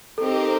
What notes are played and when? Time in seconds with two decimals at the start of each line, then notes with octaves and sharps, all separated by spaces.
0.18 C4 D#4 G4 A4 A#4